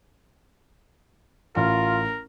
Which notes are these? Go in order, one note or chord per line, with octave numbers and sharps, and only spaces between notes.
A1 F4 A#4